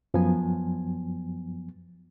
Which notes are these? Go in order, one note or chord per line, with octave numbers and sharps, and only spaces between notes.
F#2 F3 F#3 B3 G#5